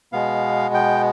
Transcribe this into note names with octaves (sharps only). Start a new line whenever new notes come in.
B2 G#3 B3 F5
G5